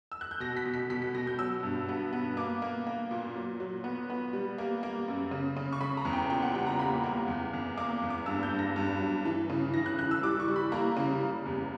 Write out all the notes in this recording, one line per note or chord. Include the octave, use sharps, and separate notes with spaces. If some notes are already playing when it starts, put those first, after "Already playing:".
E6
F#6
G6
B2 A#6
B6
B2
B6
B2 B6
B6
B2 A#6
G6
F#3 E6
G2
B3
B3
A#3 D6
A#3
A#3
A#2
F#3
F#3
B3
B3
G3
A#3
A#3
F#2
C#3
C#3
C#6
C#3 B5
A#5
E2
G5
A#2 G5
F#5
G3 G5
A#5
A#3 B5
A#3
E2
E2
A#3 D6
E2
D6
G2 E6
G6
G2
A#6
G2
F#3
E3
C#3
E3 A#6
F#6
E3 F#6
E6
G3 D6
C#6
G3
B5
A#3 A#5
C#3
G3
E2